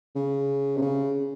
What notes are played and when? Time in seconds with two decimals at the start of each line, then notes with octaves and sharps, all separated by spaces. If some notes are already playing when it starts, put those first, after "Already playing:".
0.16 C#3
0.77 C3
0.82 C#3